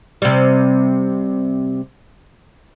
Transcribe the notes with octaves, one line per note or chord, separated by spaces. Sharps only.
C3 G3